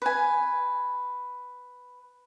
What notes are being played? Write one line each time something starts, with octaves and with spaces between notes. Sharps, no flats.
B4 G#5